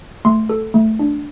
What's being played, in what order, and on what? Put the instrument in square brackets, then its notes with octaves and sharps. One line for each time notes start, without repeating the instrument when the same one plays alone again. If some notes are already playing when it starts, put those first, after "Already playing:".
[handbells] A3 C6
A4
A3
D4